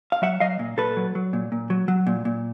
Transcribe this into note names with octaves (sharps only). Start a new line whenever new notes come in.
F5
F#3 E5 F#5
F#3 D#5 F5
A#2
A#2 A4 B4
F#3
F#3
A#2
A#2
F#3
F#3
A#2
A#2